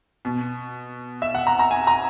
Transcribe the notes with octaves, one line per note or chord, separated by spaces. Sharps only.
B2
E5
F#5
A#5
A#5
G#5
A#5